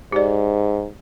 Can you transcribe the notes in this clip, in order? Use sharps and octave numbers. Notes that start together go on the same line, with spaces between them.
G#2 G4 D5